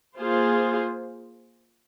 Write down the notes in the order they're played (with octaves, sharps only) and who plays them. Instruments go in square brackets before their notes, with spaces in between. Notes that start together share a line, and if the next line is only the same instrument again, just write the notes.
[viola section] A#3 F4 G#4 C5